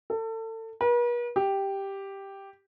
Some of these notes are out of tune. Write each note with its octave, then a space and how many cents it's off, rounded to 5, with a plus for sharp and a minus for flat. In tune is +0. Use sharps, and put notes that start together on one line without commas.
A4 +30
B4 -45
G4 +0